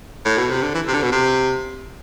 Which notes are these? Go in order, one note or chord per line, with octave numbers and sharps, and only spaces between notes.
A2
B2
C3
D3
E3
C3
D3
B2
C3